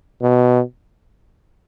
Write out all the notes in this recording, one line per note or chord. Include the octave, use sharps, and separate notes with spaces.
B2